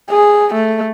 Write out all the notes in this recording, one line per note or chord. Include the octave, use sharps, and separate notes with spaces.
G#4
A3